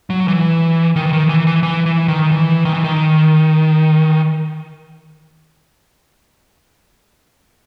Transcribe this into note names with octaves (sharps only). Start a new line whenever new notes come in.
F#3
E3
D#3
E3
D#3
E3
E3
E3
E3
D#3
E3
D#3
E3
D#3